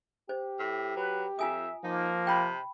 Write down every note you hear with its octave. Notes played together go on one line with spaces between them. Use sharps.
G4 C5
A2
F#3 B4
F2 F4 E5 G#5 D#6
F3 A#3 D#4
C3 G5 B5